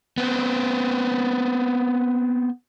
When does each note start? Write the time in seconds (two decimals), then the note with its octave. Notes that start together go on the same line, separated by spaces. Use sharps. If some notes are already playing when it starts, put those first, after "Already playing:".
0.18 B3 C4